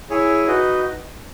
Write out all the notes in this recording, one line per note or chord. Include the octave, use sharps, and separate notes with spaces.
E4 G#4 C#5 G#5
D#4 F#4 B4 D#5